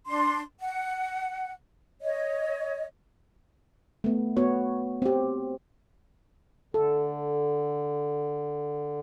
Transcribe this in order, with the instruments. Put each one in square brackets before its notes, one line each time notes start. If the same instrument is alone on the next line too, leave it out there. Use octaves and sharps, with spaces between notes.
[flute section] D4 C6
F#5
C#5 D#5
[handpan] A3 B3
B3 F#4 C#5
C4 G4
[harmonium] D3 [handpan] A4